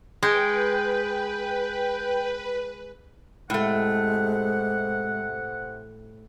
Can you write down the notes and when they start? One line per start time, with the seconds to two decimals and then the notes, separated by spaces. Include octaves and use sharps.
0.23 G#3 B4 G5
3.50 A2 C3 G#3 A3 F#5